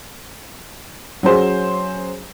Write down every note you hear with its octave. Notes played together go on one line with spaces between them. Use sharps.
F#3 C#4 G#4 C5